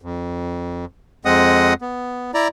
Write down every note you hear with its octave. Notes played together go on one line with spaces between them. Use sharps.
F2
F2 G#3 C4 D#5 F#5 D#6
B3
E4 D5 A#5